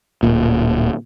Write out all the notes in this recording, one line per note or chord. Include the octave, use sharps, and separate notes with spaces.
D1 A#2